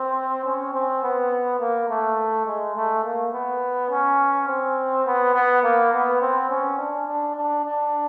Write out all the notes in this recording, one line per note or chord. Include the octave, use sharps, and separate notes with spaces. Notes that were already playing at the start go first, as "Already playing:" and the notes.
Already playing: C4
C#4
C4
B3
A#3
A3
G#3
A3
A#3
B3
C#4
C4
B3
B3
A#3
B3
C4
C#4
D4
D4
D4
D4